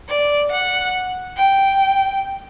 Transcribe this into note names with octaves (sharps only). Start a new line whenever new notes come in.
D5
F#5
G5